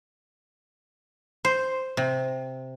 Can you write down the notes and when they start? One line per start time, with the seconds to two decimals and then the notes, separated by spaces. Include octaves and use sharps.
1.45 C5
1.97 C3